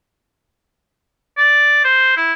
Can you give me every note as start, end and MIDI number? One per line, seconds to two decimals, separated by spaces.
1.38 1.81 74
1.85 2.14 72
2.17 2.33 64